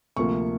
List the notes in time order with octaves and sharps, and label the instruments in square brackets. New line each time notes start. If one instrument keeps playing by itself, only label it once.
[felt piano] D2 C3 F3 A#3 C#6